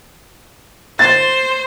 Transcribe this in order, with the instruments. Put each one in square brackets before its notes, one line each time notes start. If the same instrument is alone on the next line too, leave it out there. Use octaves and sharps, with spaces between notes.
[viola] C5 [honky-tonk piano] A6